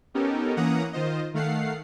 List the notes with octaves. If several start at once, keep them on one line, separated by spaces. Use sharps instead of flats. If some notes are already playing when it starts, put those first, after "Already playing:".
B3 C#4 D#4 G4 A4 A#4
E3 A#3 C#4 F#5 A#5 D#6
D#3 F4 C5 D#5
D#3 A3 F5 F#5 C7